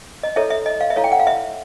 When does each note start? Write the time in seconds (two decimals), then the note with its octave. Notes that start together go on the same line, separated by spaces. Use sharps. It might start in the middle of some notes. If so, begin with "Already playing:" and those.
0.23 D#5
0.36 E4 A4 C#5 E5
0.50 E5
0.66 D#5
0.81 F5
0.90 E5
0.96 E4 A4 C#5 F5
1.04 G5
1.12 F#5
1.19 F5
1.27 E5